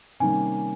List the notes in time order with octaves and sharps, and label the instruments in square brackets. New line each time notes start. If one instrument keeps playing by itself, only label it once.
[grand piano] C3 D#3 G3 A#3 C#4 [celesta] G#5